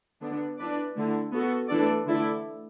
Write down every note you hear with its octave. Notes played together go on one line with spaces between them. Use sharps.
D3 B3 D4
E3 D4 B4 D5
D3 A3 E4
B3 F#4 A4
E3 A3 D4 A4 D5
D3 A3 E4 A4 D5